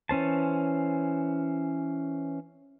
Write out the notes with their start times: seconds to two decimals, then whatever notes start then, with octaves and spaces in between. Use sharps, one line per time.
0.09 E3 C#4 C5 A5